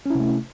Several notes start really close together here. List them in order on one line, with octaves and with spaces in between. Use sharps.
C#4 E4 C3 A3